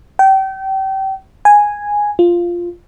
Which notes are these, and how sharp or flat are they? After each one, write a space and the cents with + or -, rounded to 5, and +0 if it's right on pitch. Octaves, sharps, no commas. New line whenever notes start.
G5 -30
G#5 -5
F4 -5